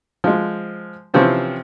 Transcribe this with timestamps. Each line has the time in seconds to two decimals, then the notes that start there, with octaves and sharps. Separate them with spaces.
0.24 F3 G#3
1.14 C3 E3 F3 C4 C#4